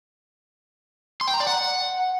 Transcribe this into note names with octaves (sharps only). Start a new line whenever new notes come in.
C6
G5
A#5
D5
F#5